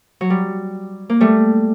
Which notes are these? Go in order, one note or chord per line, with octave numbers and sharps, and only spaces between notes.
F#3
G3
A#3
G3 A3